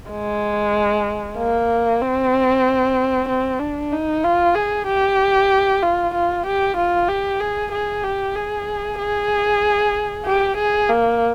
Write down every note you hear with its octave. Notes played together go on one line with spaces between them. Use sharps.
G#3
A#3
C4
C4
D4
D#4
F4
G#4
G4
F4
F4
G4
F4
G4
G#4
G#4
G4
G#4
G#4
G4
G#4
A#3